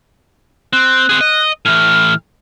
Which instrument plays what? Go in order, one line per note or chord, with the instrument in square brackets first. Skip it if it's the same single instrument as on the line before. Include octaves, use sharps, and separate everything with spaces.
[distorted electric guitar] C4 [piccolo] F#6
[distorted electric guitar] C4 G#4
D#5
[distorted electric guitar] A2 E3 [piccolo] F6